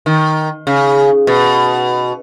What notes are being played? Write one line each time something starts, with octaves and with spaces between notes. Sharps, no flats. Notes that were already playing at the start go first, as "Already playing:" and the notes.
D#3
C#3
B2